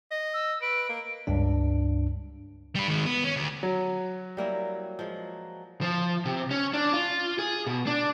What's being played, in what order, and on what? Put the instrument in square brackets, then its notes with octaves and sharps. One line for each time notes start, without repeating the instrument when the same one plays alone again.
[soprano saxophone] D#5
[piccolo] E6
[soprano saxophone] B4 [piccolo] D7
[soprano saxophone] A#3
[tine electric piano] C#2 G2 D4
[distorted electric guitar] G3 B4
D#3 G#3
B3
C#4
D2
[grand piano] F#3
[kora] G3 A#3 E4
F3 G#3
[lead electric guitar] F3
C3
C#4
D4
F4
G#4
B2
D4